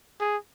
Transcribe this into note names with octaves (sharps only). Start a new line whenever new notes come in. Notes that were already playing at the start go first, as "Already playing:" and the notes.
G#4